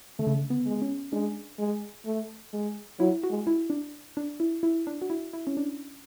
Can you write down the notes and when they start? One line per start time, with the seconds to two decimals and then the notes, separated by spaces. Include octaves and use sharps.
0.19 D3 A3
0.27 C#3
0.34 D3
0.50 B3
0.66 G#3
0.82 C#4
1.13 G#3 D4
1.59 G#3
2.06 A3
2.53 G#3
2.99 F#3 E4
3.23 F#4
3.30 G#3
3.47 E4
3.70 D4
4.17 D4
4.40 E4
4.63 E4
4.87 D4
5.02 F#4
5.10 E4
5.33 E4
5.47 C#4
5.57 D4